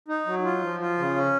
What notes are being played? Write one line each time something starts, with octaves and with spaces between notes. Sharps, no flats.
D#4
F#3
F4
F3
F4
C#3
C#4